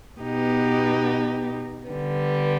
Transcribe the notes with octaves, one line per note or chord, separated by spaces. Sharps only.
B2 B3 D#4 G4
D3 G3 B3